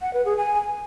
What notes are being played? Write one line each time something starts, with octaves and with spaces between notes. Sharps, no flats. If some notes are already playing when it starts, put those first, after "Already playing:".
F#5
B4
G#4
G#5